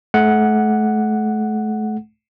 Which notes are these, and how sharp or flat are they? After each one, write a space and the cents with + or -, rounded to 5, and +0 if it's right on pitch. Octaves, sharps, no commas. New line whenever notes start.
A3 -35 F#5 +0